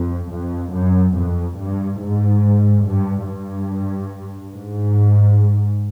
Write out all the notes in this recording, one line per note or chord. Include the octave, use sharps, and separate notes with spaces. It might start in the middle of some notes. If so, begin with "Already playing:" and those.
Already playing: F2
F2
F#2
F2
G2
G#2
G2
G2
G#2